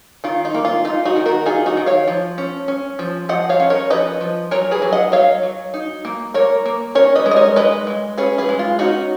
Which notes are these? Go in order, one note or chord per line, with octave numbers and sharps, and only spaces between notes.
D#3 F4
D#4
A#3
F4
D#4 F4
D#4 F#4
D#3
F#4 A#4
D#4 F4 G#4
D#4 F#4
D#3
C#5 F5
F3
C#4
C#4
F3
F3 D#5 F#5
C#5 F5
C#4
A#4 C#5
F3 B4 D#5
F3
F#3 A#4 C#5
G#4 B4
F#3
D#5 F#5
F#3 C#5 F5
F#3
D#4
A#3
A#3 A#4 C#5
A#3
C#4 A#4 C#5
B4 D#5
G#3
D#5
A#4 C#5
G#3 B4 D#5
G#3
C#4 G#4 B4
G#4 B4
G#3
F4
C#4 D#4 F#4